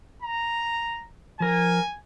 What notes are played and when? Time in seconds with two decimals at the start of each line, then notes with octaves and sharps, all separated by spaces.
0.22 A#5
1.40 F3 A#4 G#5